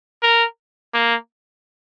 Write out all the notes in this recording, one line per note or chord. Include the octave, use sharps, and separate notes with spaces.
A#4
A#3